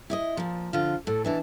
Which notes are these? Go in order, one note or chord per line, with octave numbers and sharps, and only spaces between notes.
E4 D5 D#5
A#2 F3
F2 D3 F4
A2 A4
B2 E3 D4 A5